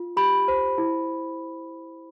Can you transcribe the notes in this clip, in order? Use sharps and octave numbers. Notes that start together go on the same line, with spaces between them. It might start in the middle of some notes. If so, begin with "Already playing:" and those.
Already playing: F4
G4 B5
C5
E4